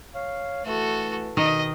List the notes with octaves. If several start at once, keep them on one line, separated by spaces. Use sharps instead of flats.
C#5 F5
E3 A3 F#4 A4
B2 D#3 D#5